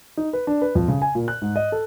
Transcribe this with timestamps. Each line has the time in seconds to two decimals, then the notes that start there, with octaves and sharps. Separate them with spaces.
0.17 D#4
0.33 B4
0.47 D4
0.62 B4
0.75 F2
0.88 C#3
1.02 G#5
1.15 A#2
1.28 F#6
1.42 G#2
1.56 D#5
1.72 A4